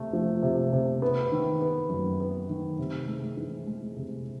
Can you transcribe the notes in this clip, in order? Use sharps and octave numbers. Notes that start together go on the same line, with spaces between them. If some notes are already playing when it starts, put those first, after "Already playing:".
Already playing: C3 A3
F3
C3
C3
B3
D#3
B3
F#2
B3
D#3
C3
G#3
E3
G#3
C3